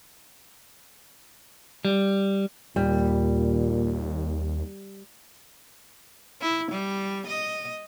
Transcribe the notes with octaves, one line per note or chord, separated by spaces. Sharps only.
G3
D#2 A#2 G3
E4
G3
D#5